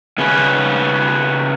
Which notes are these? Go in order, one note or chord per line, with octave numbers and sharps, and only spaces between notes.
C#3 B3 C#4